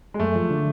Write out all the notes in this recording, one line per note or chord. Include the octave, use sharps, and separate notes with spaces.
G#3
F#2 A3
F3
D3